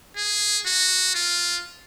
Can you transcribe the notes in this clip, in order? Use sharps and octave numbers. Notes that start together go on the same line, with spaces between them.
G#4
F#4
F4